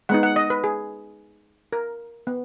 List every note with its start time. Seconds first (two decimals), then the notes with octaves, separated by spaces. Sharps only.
0.09 G#3 B3 D#4 F#5
0.23 F#5
0.36 D#5
0.50 B4
0.64 G#4
1.72 A#4
2.27 B3